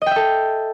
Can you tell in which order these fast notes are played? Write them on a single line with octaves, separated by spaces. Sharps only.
D#5 G5 E5 A4